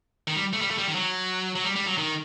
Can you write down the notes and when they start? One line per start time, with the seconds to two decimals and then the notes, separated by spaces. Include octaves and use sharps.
0.27 D#3
0.36 G3
0.53 A3
0.61 G3
0.71 A3
0.78 G3
0.87 D#3
0.95 F#3
1.55 F#3
1.64 G3
1.76 G3
1.87 F#3
1.98 D#3